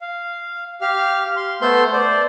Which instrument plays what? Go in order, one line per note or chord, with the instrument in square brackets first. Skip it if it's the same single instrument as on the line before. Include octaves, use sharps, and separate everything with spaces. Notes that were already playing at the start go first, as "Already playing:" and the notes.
[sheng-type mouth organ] F5
G4 F5 F6
C6
A3 B3 A4 C5 C6 G6
C5 D5